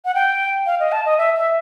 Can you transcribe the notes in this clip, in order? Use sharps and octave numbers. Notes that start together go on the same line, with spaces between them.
F#5
G5
F5
D#5
A5
D#5
E5
E5